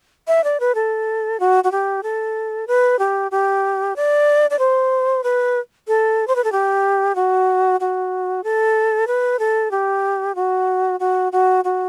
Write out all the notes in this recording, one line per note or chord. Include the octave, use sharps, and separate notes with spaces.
E5
D5
B4
A4
F#4
F#4
G4
A4
B4
G4
G4
D5
D5
C5
B4
A4
C5
B4
A4
G4
F#4
F#4
A4
B4
A4
G4
F#4
F#4
F#4
F#4